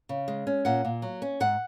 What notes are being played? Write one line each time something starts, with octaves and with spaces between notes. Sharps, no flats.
C#3
G#3
C#4
A#2 F#5
A#2
F#3
C#4
G#2 F#5